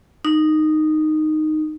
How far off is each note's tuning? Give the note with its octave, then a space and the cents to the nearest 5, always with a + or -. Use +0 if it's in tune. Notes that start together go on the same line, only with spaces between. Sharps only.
D#4 -10